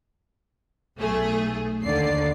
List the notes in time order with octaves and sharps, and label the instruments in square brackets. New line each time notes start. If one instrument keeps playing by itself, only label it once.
[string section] B1 A3 G#4
[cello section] D#2 D3 D5 [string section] C7